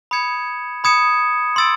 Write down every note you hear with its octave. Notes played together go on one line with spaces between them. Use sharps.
B5 D#6 G#6 C#7 E7
B5 D#6 G#6 C#7 E7
C6 E6 A6 D7